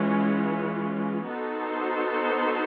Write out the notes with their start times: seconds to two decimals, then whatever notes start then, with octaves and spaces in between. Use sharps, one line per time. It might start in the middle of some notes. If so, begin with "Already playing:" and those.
Already playing: E3 G#3 C#4 F4
1.29 B3 D#4 F#4 A4 C5